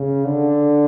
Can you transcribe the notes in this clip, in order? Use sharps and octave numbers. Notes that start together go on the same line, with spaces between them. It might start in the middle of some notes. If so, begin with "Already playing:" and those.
Already playing: C#3
D3